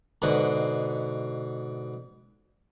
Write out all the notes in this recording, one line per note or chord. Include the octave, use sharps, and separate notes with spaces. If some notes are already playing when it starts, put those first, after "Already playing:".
G#2 B2 D3